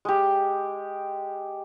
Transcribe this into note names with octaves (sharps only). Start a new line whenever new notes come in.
G#3 G4